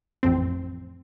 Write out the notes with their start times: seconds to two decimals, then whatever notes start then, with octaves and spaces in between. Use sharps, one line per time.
0.23 A1 F2 C4